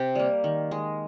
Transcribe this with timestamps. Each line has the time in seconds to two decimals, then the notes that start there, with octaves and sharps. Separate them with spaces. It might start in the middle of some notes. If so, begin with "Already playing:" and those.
Already playing: C3 G4
0.15 G3 A#3
0.44 D#3
0.71 G#3